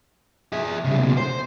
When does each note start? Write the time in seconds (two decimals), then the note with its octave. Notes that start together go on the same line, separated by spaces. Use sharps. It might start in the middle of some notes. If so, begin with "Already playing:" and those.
0.52 G#4 E5
0.85 C#3 G3
0.98 C#2 B2
1.17 C5